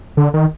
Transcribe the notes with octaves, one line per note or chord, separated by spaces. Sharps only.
D3
D#3